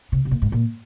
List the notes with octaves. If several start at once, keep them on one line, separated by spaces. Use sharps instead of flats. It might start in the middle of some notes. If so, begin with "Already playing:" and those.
C3
C3
A#2
G#2
A#2